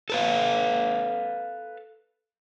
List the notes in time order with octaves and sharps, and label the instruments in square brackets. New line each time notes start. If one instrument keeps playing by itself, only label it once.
[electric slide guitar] A4 B4 F5